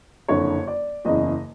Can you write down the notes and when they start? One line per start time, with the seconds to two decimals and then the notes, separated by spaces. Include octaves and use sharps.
0.28 F#1 F2 D3 C#5
0.68 D5
1.05 F#1 E2 C#3 D#5